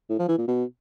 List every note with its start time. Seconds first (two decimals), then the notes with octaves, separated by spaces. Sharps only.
0.09 A2
0.19 F3
0.28 E3
0.38 A#2
0.48 B2